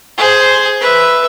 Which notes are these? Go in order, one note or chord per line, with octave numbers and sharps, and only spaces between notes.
G#4 C5
B4 E5